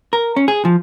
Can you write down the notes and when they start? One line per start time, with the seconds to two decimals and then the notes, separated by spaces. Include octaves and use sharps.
0.13 A#4
0.36 C#4
0.48 G#4
0.65 F3